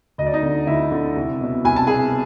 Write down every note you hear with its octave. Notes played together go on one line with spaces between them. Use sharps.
D2 D#5
D5
D#4 D#5
D3
D2 E4 E5
D3
C2
B2
C2 G#5
A5
B2 G#4 G#5